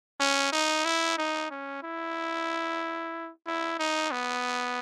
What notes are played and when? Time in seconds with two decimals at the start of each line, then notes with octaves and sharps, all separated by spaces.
0.20 C#4
0.52 D#4
0.85 E4
1.18 D#4
1.51 C#4
1.83 E4
3.47 E4
3.79 D#4
4.11 B3